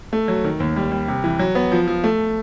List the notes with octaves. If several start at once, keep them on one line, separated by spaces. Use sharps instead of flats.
A3
F#3
D#3
D#2
G3
G3
C3
E3
F#3
B3
F3
F3
A3